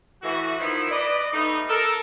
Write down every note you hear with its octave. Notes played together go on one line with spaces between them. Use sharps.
A2 E3 F#4
D#3 F3 B3 D#4 E4
B4 D5 D#5
G3 A3 B3 D#4
A4 A#4